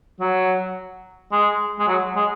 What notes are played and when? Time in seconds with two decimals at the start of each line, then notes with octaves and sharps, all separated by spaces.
0.20 F#3
1.32 G#3
1.79 G#3
1.88 F#3
2.16 G#3